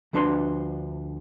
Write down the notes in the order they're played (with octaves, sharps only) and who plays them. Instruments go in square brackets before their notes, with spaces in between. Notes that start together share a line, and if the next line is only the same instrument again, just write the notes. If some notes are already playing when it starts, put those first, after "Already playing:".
[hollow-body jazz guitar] D2 F3 D4 B4 B5 C6